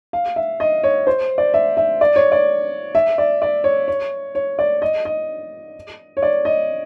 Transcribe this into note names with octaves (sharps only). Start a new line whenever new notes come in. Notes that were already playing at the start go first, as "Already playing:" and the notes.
F5
E5
D#5
C#5
C5
D5
E5
E5
D5
C#5
D5
E5
D5
D5
C#5
C#5
C#5
D5
D#5
D#5
C#5
D5
D#5